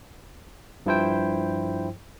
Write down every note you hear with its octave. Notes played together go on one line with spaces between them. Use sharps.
G2 F3 E4 C5 G5